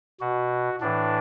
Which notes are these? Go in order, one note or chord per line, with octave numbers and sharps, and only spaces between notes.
B2 F#4
A2 E3 D4